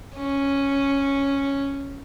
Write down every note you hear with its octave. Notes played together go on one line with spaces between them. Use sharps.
C#4